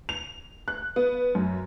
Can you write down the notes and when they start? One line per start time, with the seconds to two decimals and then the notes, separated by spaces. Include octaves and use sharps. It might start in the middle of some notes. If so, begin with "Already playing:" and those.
0.09 F7
0.68 F#6
0.96 B3
1.35 F#2